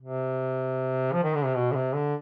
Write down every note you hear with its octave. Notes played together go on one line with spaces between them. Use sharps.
C3
F3
D#3
D3
C3
B2
D3
C3
D3